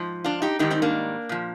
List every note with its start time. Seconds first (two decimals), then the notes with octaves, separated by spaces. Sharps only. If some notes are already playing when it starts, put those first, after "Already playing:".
Already playing: G#2 F3
0.24 D4 F4
0.42 D#4 G4
0.59 G#2 D#3 G3 D#4 G4
0.71 C4 D#4
0.82 A#3 D4
1.29 A#2 F3